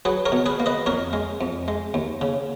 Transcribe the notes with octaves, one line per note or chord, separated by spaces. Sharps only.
F#3 G#4 B4
A#4 C#5
B2
G#4 B4
A#3
B4 D#5
F2 A#4 C#5
G#3
F2
G#3
D#2
C#3